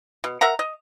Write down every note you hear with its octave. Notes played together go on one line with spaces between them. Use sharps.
B2
A#4 E5 F#5 A#5
D#5